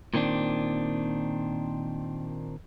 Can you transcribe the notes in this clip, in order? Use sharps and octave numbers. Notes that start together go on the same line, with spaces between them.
A#2 D#3 C4 D4